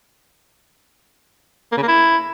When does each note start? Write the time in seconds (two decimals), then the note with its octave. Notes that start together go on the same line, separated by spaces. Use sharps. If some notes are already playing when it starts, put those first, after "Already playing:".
1.72 A#3
1.77 C#3
1.83 A#3
1.88 E4